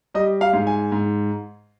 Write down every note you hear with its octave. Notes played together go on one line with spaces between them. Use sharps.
G3 D#5
F5
G#2
G#5
G#2